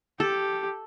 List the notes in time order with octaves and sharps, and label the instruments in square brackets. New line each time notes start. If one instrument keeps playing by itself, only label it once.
[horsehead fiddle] G4 [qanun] A4